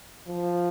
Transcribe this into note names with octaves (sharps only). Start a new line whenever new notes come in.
F3